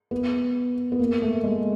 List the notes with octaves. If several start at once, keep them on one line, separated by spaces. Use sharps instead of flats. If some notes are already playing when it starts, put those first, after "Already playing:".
B3
B3
A#3
A3
G#3